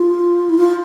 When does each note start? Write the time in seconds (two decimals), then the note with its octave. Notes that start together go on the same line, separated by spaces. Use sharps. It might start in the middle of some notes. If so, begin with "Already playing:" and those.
Already playing: F4
0.49 E4
0.58 F4